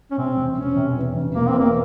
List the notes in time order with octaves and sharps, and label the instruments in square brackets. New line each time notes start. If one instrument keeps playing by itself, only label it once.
[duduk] C#4
[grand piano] C3 [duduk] C4
[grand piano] E1
[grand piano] E1 [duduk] C#4
[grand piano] C3
E2
E1
[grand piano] E1 [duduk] A#3
[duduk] C4
[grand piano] E2 [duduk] A#3